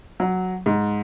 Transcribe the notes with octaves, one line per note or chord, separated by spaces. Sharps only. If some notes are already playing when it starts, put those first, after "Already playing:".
F#3
G#2